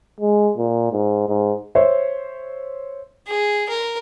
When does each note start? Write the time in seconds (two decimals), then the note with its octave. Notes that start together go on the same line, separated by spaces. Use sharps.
0.20 G#3
0.57 A#2
0.92 G#2
1.29 G#2
1.75 C5 C#5 E5
3.27 G#4
3.69 A#4